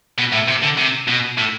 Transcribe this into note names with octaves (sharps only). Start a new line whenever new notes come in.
B2
A2
C3
D3
C3
B2
A2